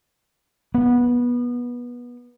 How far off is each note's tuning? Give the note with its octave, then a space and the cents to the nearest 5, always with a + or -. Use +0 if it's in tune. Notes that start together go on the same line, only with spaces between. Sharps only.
B3 -20